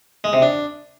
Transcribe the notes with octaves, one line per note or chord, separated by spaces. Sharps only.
G#3
C3
D4